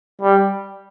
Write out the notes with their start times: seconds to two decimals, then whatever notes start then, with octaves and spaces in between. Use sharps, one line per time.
0.21 G3